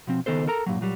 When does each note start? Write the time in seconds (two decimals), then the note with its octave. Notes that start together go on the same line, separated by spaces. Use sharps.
0.07 B2 F3 C4
0.26 C#2 D#3 B3 A4 C5
0.47 A4 A#4 A#5
0.66 G2 A#2 F#3
0.81 A#2 F#3 G3